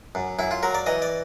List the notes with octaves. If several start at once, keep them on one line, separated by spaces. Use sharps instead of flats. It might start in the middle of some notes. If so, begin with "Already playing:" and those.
F#2
F#2 E4
F4
F#3 A#4
D5
E3 D#5
D5